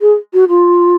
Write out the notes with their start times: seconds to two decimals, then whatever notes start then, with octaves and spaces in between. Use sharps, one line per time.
0.01 G#4
0.33 F#4
0.49 F4